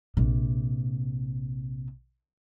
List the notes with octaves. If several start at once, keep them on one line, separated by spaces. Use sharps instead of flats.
A#1 C3